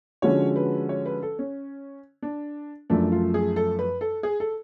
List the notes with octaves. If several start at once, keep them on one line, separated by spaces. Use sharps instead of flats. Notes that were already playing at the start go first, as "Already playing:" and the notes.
D3 F3 G#3 C#4 F#4 C#5
B4
C#5
B4
A4
C#4
D4
F#2 F3 A3 D4
F4
G#4
A4
B4
A4
G#4
A4